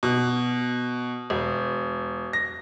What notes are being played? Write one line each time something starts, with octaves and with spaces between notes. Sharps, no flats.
B2
E1
A#6